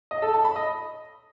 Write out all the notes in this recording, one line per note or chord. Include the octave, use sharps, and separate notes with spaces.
D#5
A4
A5
B5
D#5